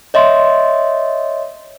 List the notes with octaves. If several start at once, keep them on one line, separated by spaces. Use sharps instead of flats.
C#5 D#5 E5 C6